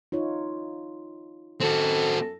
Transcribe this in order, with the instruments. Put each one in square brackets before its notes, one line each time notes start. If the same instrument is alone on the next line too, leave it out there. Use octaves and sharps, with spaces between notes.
[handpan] D#4 F4 C#5
[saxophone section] F#2 A4 [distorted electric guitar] C4 F#4